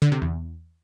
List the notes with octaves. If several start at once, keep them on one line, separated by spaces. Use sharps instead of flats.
D3
C3
E2